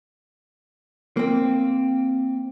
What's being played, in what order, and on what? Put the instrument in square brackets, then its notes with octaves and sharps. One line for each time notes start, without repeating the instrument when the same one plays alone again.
[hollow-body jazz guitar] A#3 C4